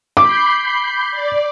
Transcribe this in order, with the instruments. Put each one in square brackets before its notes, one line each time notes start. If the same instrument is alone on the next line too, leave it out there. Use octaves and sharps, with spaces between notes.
[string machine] B5 G6 C7 [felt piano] D6
[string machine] D5